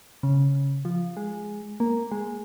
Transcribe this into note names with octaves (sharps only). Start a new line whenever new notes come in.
C#3
F3
G#3
A#3
G#3